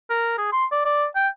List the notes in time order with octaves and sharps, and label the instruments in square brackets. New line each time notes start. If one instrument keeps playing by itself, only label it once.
[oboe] A#4
G#4
C6
D5
D5
G5